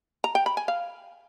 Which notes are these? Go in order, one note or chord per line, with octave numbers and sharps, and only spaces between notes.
A#5
G5
B5
G#5
F5